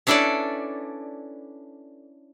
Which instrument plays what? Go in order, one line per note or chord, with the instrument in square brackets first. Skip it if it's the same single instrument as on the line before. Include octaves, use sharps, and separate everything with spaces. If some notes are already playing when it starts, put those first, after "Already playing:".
[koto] C#4 D4 E4 A4 B4 D5